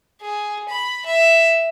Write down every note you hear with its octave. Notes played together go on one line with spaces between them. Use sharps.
G#4
B5
E5